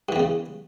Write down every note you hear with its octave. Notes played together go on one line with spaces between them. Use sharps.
E2 G2 C#3 E3